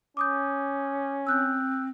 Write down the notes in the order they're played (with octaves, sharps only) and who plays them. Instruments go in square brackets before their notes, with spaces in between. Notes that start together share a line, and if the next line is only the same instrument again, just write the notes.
[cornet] C#4 [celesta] D6 D#6 G6
[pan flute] C4 [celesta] E6 F#6 G6